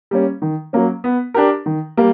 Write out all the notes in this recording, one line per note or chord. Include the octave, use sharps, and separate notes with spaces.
G3 A#3 C#4
D#3
F#3 A#3 C#4
B3
D4 G4 A#4
D#3
G3 A#3